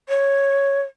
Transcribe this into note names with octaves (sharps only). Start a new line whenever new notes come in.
C#5